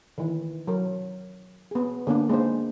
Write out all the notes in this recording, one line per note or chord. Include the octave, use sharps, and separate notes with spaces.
D#3 E3
F#3 A#4
B3 G#4
D3 A#3 B3 D4
G#3 A#3 D4 D#4 C5